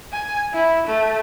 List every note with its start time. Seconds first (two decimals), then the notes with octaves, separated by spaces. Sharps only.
0.12 G#5
0.53 E4
0.87 A3